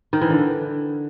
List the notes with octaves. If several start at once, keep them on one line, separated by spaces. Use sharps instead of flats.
D#3
E3
D3